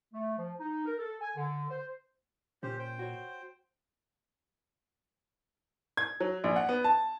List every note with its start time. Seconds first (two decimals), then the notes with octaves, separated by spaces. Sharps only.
0.14 A3
0.38 F3
0.59 D#4
0.86 A#4
0.99 A4
1.22 G#5
1.36 D3
1.70 C5
2.63 A#2 C#4 G4 C5
2.79 C5 G5
2.99 F#4 C#5
5.97 G#6
6.20 F#3
6.44 A#1
6.56 F#5
6.69 B3
6.84 A5